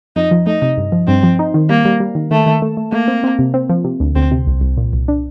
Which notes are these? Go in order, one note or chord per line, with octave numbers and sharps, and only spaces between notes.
F2 D#4
F3
A3 D#4
C3
G2
F3
G2 C4
F3
D#4
D#3
G3 A#3
G3
G3
D#3
D#3 A3
D#3
A3
A3
A3 A#3
C4
C4
C3
C4
F3
C3
D2
D2 C4
C3
C2
C2
A#2
C2
D4